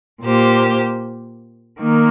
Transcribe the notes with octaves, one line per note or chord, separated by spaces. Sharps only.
A#2 A#3 G4 C5
D#3 A#3